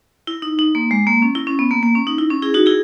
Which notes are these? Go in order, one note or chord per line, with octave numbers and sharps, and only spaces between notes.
E4
D#4
D#4
A#3
G#3
A#3
C#4
E4
C#4
B3
A#3
A#3
C#4
D#4
E4
C#4
E4 G#4
D#4 F#4
E4 G#4